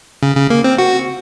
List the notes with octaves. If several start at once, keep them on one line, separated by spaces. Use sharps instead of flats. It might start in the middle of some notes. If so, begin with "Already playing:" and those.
C#3
C#3
A#3
C4
F#4